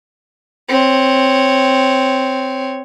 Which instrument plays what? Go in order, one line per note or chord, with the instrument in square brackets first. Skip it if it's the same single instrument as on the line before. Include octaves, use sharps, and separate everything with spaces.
[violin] C4 C#5